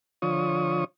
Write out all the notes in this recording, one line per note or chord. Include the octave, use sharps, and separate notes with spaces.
D3 F3 F4 C#5 C#6 D#6